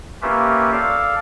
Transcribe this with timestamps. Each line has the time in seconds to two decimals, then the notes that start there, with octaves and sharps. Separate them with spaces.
0.22 A#3 C#4 F4 G4 B4 E5
0.72 A4 D5 F5